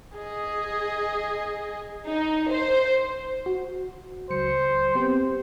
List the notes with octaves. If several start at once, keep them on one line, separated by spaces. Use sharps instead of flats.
G#4 D#5
D#4
C5
F#4
C#2 F#3 C5 C#7
B3 C4 G4